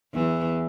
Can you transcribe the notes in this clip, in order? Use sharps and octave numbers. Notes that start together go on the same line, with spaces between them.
E2 E3